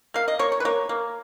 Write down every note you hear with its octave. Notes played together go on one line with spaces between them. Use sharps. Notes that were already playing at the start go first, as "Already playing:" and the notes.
A#3 F5
D#5
A#3 C#5
C#5
B4
A#3 C#5
A#3